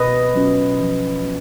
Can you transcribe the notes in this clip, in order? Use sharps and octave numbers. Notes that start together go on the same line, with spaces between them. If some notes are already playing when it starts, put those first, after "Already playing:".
Already playing: B2 B4 D#5
F#3 C#4 F4
F3
B3